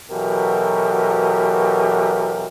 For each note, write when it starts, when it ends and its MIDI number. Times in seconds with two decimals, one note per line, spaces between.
0.11 2.47 47
0.11 2.47 52
0.11 2.47 54
0.11 2.47 67
0.11 2.47 69
0.11 2.47 70